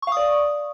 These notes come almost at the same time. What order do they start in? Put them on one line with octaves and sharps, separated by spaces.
C#6 F5 D#6 D5